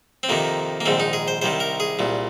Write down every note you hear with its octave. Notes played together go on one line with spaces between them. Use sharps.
C4
F2 C3 D#3 A#3
A#3
A#1 G#2 D#3 C4
D#4
G#4
C5
C2 C3 D#3 C5
A#4
G#4
C2 A#2